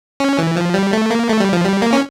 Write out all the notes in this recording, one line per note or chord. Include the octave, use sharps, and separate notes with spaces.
C#4
E3
F3
G3
A3
A#3
A3
G3
F3
G3
A#3
C#4